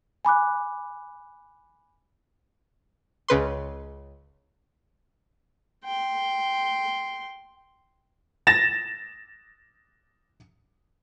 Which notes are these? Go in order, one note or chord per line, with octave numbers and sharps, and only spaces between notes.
G#5 B5 D6 F#6
C#2 C#3 B4 C6
G5 C6
A6 A#6 E7